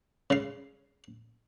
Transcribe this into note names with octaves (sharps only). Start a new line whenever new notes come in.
C#3 F5